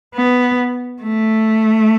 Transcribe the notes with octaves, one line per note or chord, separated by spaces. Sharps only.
B3
A3